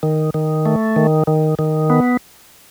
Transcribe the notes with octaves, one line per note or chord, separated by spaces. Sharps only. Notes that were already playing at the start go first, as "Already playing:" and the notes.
D#3
D#3
A3
D#3
D#3
D#3
B3